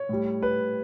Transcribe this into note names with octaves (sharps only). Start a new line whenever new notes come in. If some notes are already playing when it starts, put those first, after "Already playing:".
Already playing: C#5
A2 G3
B4